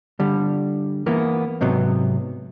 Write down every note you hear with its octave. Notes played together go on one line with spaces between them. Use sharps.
D3 G3
E3 A#3 B3
G#2 C3 F#3 B3